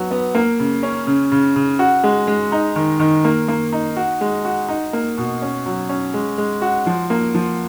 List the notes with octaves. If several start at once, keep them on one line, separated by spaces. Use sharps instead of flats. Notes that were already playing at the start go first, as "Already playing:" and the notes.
Already playing: F#3 B3
B3
A#3
C#3
C#4
C#3
C#3
C#3
F#4
G#3
G#3
D#4
D#3
D#3
A#3
A#3
D#4
F#4
G#3
F#4
D#4
A#3
B2
C#4
F#3
C#4
G#3
G#3
F#4
F3
A#3
F3